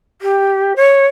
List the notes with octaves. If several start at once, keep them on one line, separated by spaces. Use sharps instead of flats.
G4
C#5